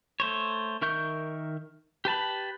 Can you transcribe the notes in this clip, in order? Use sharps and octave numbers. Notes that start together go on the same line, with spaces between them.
A3 C5 C#5
D#3 A#4 E5 C#6 G6
G4 B4 A5 B5